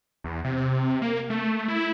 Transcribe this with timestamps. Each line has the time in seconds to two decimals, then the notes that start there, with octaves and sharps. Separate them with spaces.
0.24 E2
0.44 C3
1.02 A#3
1.30 A3
1.68 E4